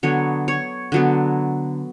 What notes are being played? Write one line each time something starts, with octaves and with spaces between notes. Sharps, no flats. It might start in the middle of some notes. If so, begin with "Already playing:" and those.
D3 F#3 B3 C#5
C#5
D3 F#3 B3